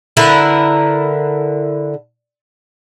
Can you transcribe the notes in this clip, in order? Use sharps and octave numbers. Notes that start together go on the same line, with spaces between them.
D3 E4 A#4 B4